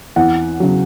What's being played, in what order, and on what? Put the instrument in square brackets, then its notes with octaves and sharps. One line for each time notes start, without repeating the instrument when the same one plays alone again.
[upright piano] E2 F#5
C#3 F#3